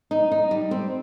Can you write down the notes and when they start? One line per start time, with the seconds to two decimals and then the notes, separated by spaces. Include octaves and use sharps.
0.11 D#4
0.32 D#4
0.51 G3
0.71 C4